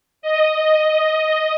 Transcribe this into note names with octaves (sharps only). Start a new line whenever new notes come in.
D#5